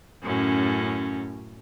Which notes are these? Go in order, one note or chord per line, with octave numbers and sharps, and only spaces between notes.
F#2 A2 C#4